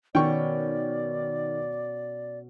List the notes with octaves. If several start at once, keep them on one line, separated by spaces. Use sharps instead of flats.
B2 D#3 C#4 D5 G5 C#6